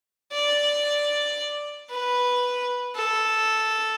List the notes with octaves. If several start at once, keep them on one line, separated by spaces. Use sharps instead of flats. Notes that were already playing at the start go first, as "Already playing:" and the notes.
D5
B4
A4